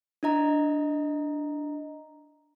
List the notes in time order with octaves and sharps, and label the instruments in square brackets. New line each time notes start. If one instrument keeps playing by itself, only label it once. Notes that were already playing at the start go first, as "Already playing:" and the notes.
[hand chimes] D4 E4 D#5 A#5